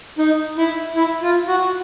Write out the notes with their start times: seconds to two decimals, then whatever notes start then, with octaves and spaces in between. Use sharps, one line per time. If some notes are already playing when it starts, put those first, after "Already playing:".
0.18 D#4
0.58 E4
0.96 E4
1.22 F4
1.48 F#4